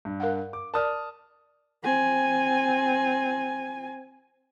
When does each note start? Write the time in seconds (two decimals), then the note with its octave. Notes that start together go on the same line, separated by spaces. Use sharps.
0.05 G2
0.20 A#4 F5 F#5
0.53 D6
0.74 A#4 D5 A5 D#6 F6
1.84 C4 G#5